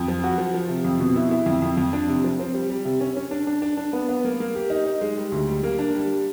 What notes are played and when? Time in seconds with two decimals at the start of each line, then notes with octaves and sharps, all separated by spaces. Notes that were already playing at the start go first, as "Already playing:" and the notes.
Already playing: F2
0.08 F3
0.24 F#4
0.38 F3
0.54 F3
0.69 C3
0.84 F2
1.00 B2
1.16 E4
1.31 E4
1.46 F2
1.62 F2
1.77 F2
1.93 D4
2.08 C3
2.24 F3
2.39 C4
2.54 G3
2.70 G3
2.85 C3
3.01 C#4
3.17 C#4
3.31 D4
3.47 D4
3.62 D4
3.77 D4
3.93 B3
4.08 B3
4.25 A#3
4.40 A#3
4.55 G4
4.70 D#4
4.86 D#4
5.01 G#3
5.17 G3
5.32 D2
5.48 G3
5.63 A#3
5.79 D4
5.94 G3